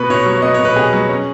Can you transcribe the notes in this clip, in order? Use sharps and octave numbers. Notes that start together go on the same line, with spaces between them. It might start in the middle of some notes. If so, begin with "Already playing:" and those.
Already playing: B2 B3 B4
B2 C#5
F#3
C#5
B3 D#5
C#5
B2
B4
B2 G#4
F#3
C#4